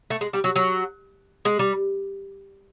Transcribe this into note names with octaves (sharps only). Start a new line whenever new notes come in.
A3
G#3
G3
F#3
F#3
G#3
G3